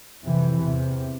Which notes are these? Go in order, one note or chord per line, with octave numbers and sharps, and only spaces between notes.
F2 C3 E3
E2 C3